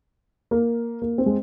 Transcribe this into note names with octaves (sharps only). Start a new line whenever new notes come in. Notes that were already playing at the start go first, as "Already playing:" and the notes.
A#3
A#3
C4
G#3